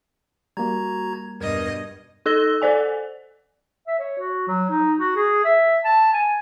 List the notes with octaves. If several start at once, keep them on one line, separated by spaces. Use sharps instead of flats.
G3 A#3 F#4 A#5 G#6
E2 G2 B2 A#4 D#5 G#6
D#4 A4 E6 A#6 G7
A4 C5 D5 G#5
E5
C#5
F#4
F#3
D#4
F#4
G#4
E5
A5
G#5